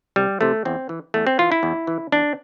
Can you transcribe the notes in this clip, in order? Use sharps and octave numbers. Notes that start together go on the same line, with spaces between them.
C2 G3
C3 E3 A3
E2 C4
E3
E2 A3
C4
E3 F4
E4
E2
E3
E2 D4